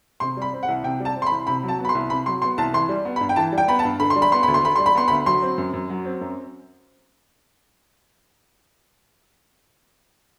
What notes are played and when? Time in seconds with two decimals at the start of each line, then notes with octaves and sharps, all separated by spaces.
0.20 C3 C6
0.37 G3 B5
0.53 C4
0.63 F#5
0.68 C2
0.83 C3 G5
1.00 G3
1.05 A5
1.16 C4
1.22 C6
1.26 B5
1.31 C2
1.47 C3 B5
1.63 F#3
1.68 A5
1.79 B3
1.85 B5
1.89 C6
1.95 C2
2.10 C3 B5
2.26 F#3 C6
2.42 B3 C6
2.58 C2 A5
2.73 E3 C6
2.89 G3
3.05 B3
3.16 B5
3.21 G2
3.29 G5
3.36 E3 A5
3.52 G3
3.58 G5
3.68 B3 B5
3.79 A5
3.85 G2
4.00 D3 B5
4.10 C6
4.16 G3
4.22 B5
4.32 B3 C6
4.43 D2 B5
4.54 C6
4.64 D3 B5
4.76 G3 C6
4.86 B5
4.95 B3 C6
5.08 B5
5.11 D2
5.26 F#3 C6
5.42 C4
5.58 F#2
5.73 F#2
5.89 F#3
6.05 C4
6.21 F#2